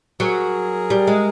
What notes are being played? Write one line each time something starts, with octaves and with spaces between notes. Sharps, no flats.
F#3 G#4 A#4
G3
G#3